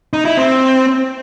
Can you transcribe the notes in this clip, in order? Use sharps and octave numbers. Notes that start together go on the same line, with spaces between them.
D#4
E4
C4